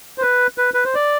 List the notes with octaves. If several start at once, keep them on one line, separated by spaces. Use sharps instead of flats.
C5
B4
B4
B4
C5
D5